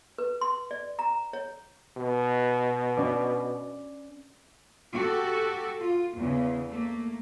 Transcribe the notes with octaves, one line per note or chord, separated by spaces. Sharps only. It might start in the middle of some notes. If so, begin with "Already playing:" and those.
B4
C6
D5
A#5
C#5
B2
C#4 D5
F#4 G4 A4
F4
E2 C#3
A3 A#3